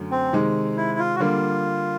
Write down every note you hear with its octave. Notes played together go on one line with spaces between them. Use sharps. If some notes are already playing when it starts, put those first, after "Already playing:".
Already playing: F#2 D3 F#3 A3
C4
C3 D#3 G#3
E4
F4
F#4
D3 G3 A#3 F4